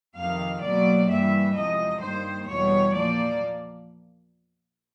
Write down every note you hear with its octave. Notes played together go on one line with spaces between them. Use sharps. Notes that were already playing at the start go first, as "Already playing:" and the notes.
F2 C3 D#3 F5
B2 F#3 A#3 D5
G2 E3 G3 A#3 E5
E2 C3 F3 G#3 D#5
G2 D#3 G3 A#3 C5
E2 B2 G3 C#5
A#2 F3 A#3 D5